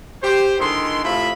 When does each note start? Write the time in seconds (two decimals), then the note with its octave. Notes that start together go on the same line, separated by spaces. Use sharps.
0.23 G4 C5
0.60 D3 D#3 G#3 E4 C6
1.04 A2 C3 F3 F4 E5 B5